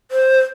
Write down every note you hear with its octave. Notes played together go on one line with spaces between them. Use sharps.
C5